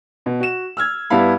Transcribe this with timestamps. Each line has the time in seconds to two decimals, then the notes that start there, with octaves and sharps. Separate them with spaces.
0.26 B2
0.40 F#4 E7
0.77 E6 F6 G#6
1.10 G2 G3 B3 E4 F5 B5